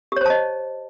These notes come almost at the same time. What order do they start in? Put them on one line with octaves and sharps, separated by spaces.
G4 C#5 C5 A5 D#5